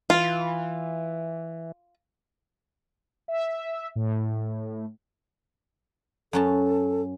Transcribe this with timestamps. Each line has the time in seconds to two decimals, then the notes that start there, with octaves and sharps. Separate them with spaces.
0.10 E3 F4
3.28 E5
3.96 A2
6.33 F#2 C#4 A4 A5